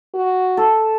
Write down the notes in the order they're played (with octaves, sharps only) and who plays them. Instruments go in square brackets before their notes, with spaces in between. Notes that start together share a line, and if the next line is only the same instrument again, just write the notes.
[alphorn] F#4
[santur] A4